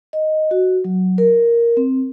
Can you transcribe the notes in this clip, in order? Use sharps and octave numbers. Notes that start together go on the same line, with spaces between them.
D#5
F#4
F#3
A#4
C4